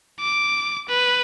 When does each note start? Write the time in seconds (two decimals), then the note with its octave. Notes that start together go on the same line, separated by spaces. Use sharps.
0.20 D6
0.89 B4